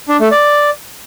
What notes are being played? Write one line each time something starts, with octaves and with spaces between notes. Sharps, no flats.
D4
A3
D5